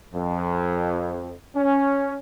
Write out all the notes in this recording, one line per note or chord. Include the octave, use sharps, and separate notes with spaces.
F2
C#4